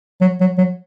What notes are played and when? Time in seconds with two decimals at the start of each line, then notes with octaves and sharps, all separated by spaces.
0.21 F#3
0.40 F#3
0.58 F#3